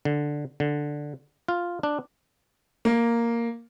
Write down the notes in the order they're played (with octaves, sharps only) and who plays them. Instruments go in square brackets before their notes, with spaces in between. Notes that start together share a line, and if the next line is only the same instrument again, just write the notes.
[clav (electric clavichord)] D3
D3
F4
D4
[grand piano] A#3